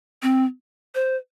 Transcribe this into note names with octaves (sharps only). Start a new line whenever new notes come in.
C4
C5